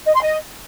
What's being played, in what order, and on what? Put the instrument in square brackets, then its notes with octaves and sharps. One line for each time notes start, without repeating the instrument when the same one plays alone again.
[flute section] D#5
C6
D#5